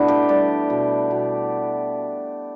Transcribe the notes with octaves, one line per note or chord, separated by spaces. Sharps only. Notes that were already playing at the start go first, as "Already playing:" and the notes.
Already playing: B2 A3 B3 D4 E4
G4
G3 D5
B2
B2